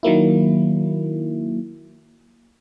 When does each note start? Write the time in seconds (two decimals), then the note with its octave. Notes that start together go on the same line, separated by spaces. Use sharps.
0.03 D#3 F#3 A#3 E4